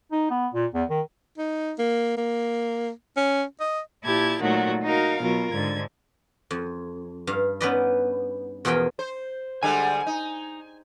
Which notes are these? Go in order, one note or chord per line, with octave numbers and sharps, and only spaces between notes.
D#4
B3
A#2
E2
D#3
D#4
A#3
A#3
C#4
D#5
A#2 E4 G4 A5 G#6
A#2 D#3 F#3 A3 F#4
D#4 F#4 A#4 F5
B2 F#3 F4 A#4
G#2 D3 G#6
F2
G2 F5
B3 C#4 D#4 B4 D5 D#5
E2 B2 F3 G#4 A#4 G5
C5
D3 G3 G#3 G#5
D#4